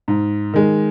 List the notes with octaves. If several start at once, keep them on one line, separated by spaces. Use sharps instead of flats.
G#2
D#3 G#3